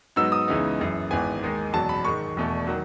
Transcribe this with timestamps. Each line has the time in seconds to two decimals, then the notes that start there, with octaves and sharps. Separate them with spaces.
0.16 G#2 F#3 B3 D#4 E6
0.32 D#6
0.48 C#2 C#3 E3 B3 D#4
0.79 F#1 F#2 E3
1.11 G#1 G#2 E3 B3 G#5
1.42 D#2 D#3 G#3 D#4
1.73 F#1 E2 B2 F#3 A5
1.89 B5
2.04 G#2 D#3 G#3 C#6
2.37 E1 E2 B2 A3
2.67 D#3 F#3